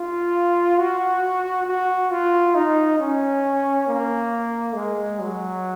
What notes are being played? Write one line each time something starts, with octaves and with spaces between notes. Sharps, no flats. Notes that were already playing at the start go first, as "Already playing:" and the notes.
Already playing: F4
F#4
F#4
F4
D#4
C#4
A#3
G#3
F#3